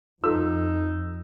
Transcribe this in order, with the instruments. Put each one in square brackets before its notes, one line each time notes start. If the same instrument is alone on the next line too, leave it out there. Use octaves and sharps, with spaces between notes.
[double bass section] F2 [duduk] D#4 [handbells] F4 A4 [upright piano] E6